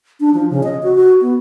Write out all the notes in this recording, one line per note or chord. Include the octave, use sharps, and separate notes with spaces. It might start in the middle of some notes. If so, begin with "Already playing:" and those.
D4
F3
C#3
D#5
F#4
F#4
B3